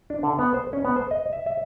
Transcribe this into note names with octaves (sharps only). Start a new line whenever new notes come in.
D4
D3
B3
C5
C#4
B3
C5
D#5
E5
E5